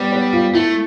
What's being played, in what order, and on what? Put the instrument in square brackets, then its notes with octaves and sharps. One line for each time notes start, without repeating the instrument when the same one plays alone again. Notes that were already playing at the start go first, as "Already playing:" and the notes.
Already playing: [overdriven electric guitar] G3 [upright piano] B3
[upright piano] B3
F4
[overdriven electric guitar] A3 [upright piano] E4